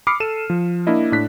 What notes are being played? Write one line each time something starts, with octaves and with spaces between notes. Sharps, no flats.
B5 D6 D#6 F6 C7 C#7
A4 D#7 E7
F3
A#3 D4 E4 D#5
A2 D4 F#6 B6